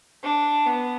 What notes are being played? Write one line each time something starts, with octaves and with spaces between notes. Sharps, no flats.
D4
B3